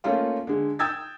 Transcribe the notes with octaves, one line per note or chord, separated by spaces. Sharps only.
A3 A#3 C#4 D#4 F4
D3 G#3
G5 D#6 E6 G#6 A6